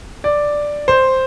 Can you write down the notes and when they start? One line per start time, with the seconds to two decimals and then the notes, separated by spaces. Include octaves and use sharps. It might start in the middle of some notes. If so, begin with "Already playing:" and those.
0.24 D5
0.88 C5